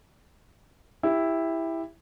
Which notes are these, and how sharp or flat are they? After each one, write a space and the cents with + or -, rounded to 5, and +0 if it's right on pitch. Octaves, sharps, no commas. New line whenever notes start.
E4 +0 G4 +20